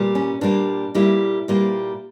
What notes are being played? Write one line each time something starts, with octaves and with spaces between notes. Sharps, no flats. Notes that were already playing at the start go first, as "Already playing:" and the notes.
Already playing: A#2 G3 A#3
C#4
A#2 G3 A#3 D4
A#2 G3 A#3 E4
A#2 G3 A#3